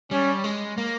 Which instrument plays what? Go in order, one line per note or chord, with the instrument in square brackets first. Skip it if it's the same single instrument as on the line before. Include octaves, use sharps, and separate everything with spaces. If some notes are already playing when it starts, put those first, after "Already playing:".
[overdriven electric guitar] G3 [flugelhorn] C#4
[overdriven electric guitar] G#3
A#3